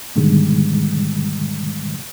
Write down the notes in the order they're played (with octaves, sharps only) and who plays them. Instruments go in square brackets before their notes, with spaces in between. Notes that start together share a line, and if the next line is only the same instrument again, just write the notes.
[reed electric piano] G#2 B2 D3 D#3 G3 G#3